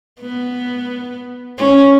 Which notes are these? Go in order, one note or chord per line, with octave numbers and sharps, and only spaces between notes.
B3
C#4